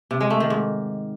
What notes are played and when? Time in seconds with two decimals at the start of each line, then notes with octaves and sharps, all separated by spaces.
0.11 C3
0.21 G#3
0.30 A3
0.40 D#3
0.50 G#2